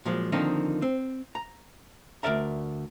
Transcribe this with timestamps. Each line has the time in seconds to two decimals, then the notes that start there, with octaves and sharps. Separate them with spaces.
0.05 A#2 F3 F#3 G#3
0.32 D3 D#3 F3 A#3 C4 D#4
0.82 C4
1.35 A#5
2.23 D2 C#3 A#4 D5 E5 A#5